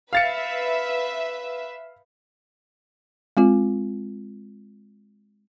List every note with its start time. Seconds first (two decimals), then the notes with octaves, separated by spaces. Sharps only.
0.13 B4 E5 F5 A6 C#7
3.37 G#3 C4 F4